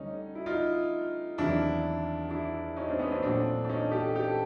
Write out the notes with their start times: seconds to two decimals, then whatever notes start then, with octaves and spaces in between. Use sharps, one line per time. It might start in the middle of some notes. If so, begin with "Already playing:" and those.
Already playing: D2 D3 G3 C#4 D#4
0.35 E4
0.46 D#4 F4
1.38 E2 C3 D#3 F#3 D4 E4
2.31 D4 E4
2.76 C#4 D#4
2.88 C4 D4
2.99 B3 C#4
3.12 C4 D4
3.22 A#1 A#2 F#3 A3 C4 D4
3.65 D4
3.69 C#4 D#4
3.92 G4 A4
4.15 G4 A4